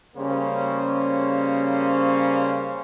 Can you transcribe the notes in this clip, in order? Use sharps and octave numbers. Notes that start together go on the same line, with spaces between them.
C#3 G3 A#3 C#4 C5